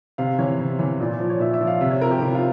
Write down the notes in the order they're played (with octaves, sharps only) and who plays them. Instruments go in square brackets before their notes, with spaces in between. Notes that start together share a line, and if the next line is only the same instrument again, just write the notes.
[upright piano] C3 F5
E3 C#5
C3
E3
A#2
F3
C#5
A#2 E5
E5
F3
F5
C3 E5
C#5
F3 A#4
G4
C3 E4
F4